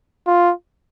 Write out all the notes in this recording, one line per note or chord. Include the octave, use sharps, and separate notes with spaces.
F4